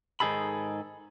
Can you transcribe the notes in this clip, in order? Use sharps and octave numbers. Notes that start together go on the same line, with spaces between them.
G#2 D#3 D#4 G#4 A4 B5